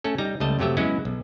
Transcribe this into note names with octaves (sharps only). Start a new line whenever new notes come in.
A3 C#4 A4
G3 D#4 A#5
C#2 G3 A3 D#5 A5
F2 C3 F#3 A3 G4 E5
F#3 G#3 B3 C#4 E4 F#4
B1